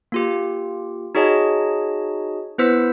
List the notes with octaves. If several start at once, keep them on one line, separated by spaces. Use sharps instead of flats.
A#3 F4 G4
D#4 F#4 G#4 C#5 D#5 A5
B3 E4 B4 C5 E6 B6